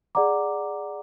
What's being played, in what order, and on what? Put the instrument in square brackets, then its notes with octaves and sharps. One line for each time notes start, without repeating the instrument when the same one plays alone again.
[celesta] G#4 D5 F#5 A#5 D6